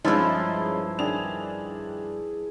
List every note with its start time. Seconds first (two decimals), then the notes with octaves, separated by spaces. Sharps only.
0.05 G2 E3 F3 G#3 C#4 D#4 E4 A5
0.99 D#3 D4 G#4 F7